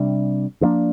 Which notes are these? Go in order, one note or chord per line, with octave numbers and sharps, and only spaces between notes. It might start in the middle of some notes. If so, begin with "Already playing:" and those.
Already playing: C3 G3 D4
G2 F3 A#3 D4